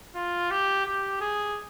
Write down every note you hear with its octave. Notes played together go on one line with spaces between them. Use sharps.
F4
G4
G4
G#4